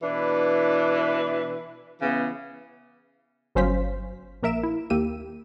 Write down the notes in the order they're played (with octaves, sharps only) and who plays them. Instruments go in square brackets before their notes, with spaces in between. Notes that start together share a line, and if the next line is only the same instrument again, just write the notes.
[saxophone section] B2 E3 D4 E4 B4
C#3 E3 B3
[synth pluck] G1 F#3 C#4 C5 F5 B6
A#1 A#3 A#4 E5 D7 E7
E4
D#2 A#3 G4 E6 D#7